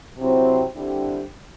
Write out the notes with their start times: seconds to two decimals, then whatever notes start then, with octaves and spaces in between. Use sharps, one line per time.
0.18 C3 F#3 C4 E4
0.74 D3 G3 C4 E4 G4